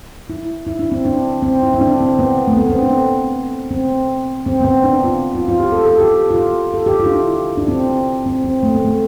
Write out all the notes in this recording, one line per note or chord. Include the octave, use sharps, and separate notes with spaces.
E4
E4
D4
C4
D4
C4
E4
C4
D4
C4
B3
A3
B3
C4
D4
C4
C4
B3
C4
D4
F4
F4
F4
G4
A4
A4
G4
F4
G4
A4
G4
F4
D4
E4
D4
C4
C4
C4
A3
B3
A3